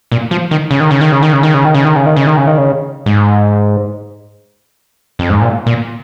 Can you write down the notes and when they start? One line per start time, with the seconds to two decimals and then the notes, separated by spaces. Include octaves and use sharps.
0.12 A#2
0.31 F3
0.51 D#3
0.71 C#3
0.80 D#3
0.91 C#3
1.01 D#3
1.12 C#3
1.23 D#3
1.33 C#3
1.43 D#3
1.54 C#3
1.65 D#3
1.74 C#3
1.85 D#3
1.96 C#3
2.06 D#3
2.16 C#3
2.27 D#3
2.37 C#3
2.47 D#3
2.58 C#3
3.06 G#2
5.19 F2
5.30 G#2
5.41 A#2
5.66 A#2